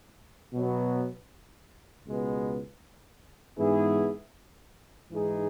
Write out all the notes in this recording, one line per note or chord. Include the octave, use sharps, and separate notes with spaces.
B2 F#3 B3
C#2 B2 G#3 B3
G#2 E3 B3 E4 G#4
G#2 E3 G#3 D#4 G#4